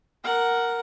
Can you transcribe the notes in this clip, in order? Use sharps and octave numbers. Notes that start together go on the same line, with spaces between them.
A#4 F#5